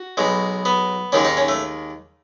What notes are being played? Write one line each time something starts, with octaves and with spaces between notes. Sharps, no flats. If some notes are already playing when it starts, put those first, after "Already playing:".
Already playing: F#4
B1 B2 G#3
B3
D#2 D#3 G#3 C#4
D#4
C#4
A3